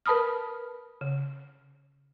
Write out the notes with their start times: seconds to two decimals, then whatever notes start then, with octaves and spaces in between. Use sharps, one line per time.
0.06 A#4 B4 A5 B5 D#6 F6
1.01 C#3